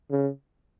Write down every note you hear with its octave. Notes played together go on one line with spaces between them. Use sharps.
C#3